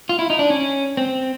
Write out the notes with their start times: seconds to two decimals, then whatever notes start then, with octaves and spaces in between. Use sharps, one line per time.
0.09 F4
0.19 E4
0.30 D#4
0.39 D4
0.50 C#4
0.97 C4